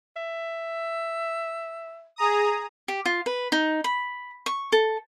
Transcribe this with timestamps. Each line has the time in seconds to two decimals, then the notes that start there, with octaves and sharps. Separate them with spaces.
0.17 E5
2.16 G#4 A#5 D#6
2.88 G4
3.06 F4
3.26 B4
3.52 D#4
3.84 B5
4.46 C#6
4.72 A4